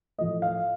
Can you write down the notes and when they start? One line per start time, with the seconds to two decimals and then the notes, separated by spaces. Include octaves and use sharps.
0.18 A2 F3 A3 D#5
0.42 F5